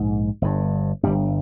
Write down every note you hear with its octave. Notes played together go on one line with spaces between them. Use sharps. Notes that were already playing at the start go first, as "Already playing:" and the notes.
Already playing: A#1 G#2
G1 G2
G1 G2 G3